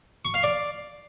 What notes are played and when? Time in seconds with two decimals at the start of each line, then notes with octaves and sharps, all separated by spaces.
0.25 C#6
0.34 F5
0.43 D5